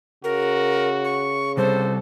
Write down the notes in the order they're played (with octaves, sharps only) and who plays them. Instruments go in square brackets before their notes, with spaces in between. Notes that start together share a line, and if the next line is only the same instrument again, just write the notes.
[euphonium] C#3 [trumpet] F#4 [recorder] A#4
[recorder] C#6
[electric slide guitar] C3 G3 [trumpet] A4 [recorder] C5